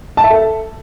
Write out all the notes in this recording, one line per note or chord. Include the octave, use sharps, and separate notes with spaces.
A5
E5
A4